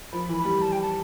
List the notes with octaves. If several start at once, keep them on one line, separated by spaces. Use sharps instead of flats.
F3 B5
E3
B5
G3
A5
G5
A5